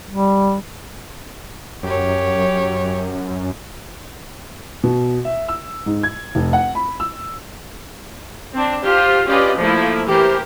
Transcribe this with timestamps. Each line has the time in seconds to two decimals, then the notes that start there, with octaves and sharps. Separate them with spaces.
0.10 G3
1.83 F#2 G4 C#5
4.84 B2
5.25 E5
5.48 E6
5.86 G#2
6.03 G#6
6.35 F1
6.53 F#5
6.75 B5
7.00 E6
8.53 C4 D4
8.83 F4 G4 C5
9.28 C#4 F4 G4 B4 D5 D#5
9.59 F3 A3 A#3 E4
10.08 E3 G4 A#4 C5